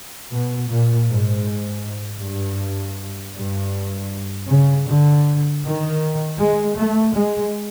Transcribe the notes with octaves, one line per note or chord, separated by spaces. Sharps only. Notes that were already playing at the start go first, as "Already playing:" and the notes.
B2
A#2
G#2
G2
G2
C#3
D3
D#3
G#3
A3
G#3